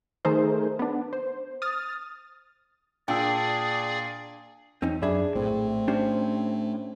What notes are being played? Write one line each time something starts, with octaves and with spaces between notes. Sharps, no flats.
D#3 A3 D#4 G#4 A#4 C5
B3 D4
C5
D#6 F6 A6
A#2 D4 G#4 D5 G5 E6
E2 C4 C#4 D#4
F#2 D4 G#4 E5 B5
A#1 A2 C4
C#4 D4 G4 C5